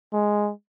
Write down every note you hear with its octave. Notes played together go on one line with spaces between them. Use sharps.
G#3